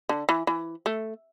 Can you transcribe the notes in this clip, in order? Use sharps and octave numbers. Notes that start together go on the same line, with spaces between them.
D3
E3
E3
A3